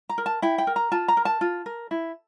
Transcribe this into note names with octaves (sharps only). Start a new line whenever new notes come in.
A#5
A#4
A5
E4 G5
G5
A#4
A#5
F4 A5
A#5
A#4
A5
F4
A#4
E4